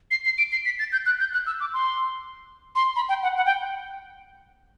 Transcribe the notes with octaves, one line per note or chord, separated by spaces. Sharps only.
C7
C7
D7
C7
B6
A6
G6
F#6
G6
F#6
E6
D6
C6
C6
B5
G5
F#5
F#5
G5